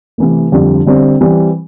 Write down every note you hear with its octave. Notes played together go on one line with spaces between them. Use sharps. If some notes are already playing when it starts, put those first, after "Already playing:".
C3 E3 A3
F2 D3 G3
D3 G3 C4
E3 G3 C4